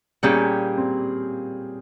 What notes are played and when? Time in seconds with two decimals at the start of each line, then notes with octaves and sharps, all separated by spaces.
0.23 A#2 G3 A#3 C#4 G4 G#4
0.78 C4